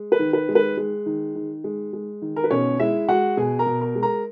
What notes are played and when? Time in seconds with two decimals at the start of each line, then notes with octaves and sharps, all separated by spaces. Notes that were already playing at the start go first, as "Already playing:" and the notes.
Already playing: G#3
0.12 B4
0.19 D#3
0.33 B4
0.49 G#3
0.55 B4
0.77 G#3
1.06 D#3
1.35 D#3
1.64 G#3
1.93 G#3
2.22 D#3
2.36 A#4
2.44 B4
2.50 B2 C#4 C#5
2.80 G#3 E4 E5
3.09 G#3 F#4 F#5
3.37 B2 G#4 G#5
3.59 A#4 A#5
3.66 B2
3.81 A#4 A#5
3.96 G#3
4.02 A#4 A#5